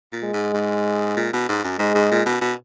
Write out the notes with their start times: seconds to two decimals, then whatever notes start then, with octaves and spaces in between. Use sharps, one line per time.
0.13 A#2
0.23 G#3
0.33 G#2
0.54 G#2
1.17 A#2
1.33 B2
1.49 G#2
1.64 F#2
1.79 G#2 G#3
1.95 G#2
2.11 A#2
2.26 B2
2.41 B2